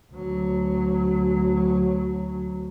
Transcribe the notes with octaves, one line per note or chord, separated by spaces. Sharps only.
D2 F#3